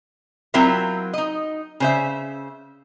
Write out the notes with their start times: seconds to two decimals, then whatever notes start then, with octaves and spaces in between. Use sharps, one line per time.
0.54 F#3 C4 E4 F4 A#4 E5
1.13 D#4 D#5
1.80 C#3 C5 E5